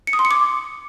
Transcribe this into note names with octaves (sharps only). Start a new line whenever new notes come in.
C#7
D#6
C6
C#7
D6